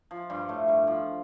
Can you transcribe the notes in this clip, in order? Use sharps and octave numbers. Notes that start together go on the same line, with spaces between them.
F3
G2 G3
A2 A3
G2 G3
F3